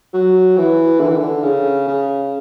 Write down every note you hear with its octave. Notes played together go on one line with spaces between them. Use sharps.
F#3
E3
D3
E3
D3
C#3
C#3